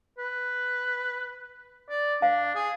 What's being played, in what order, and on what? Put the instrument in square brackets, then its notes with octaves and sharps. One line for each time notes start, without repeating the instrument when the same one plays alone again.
[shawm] B4
D5
[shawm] D4 [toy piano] F5
[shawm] G#4